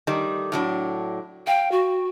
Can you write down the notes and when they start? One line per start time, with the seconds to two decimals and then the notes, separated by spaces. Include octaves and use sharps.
0.07 D#3 G3 A3
0.52 A2 F#3 D4
1.47 F5 G5
1.72 F#4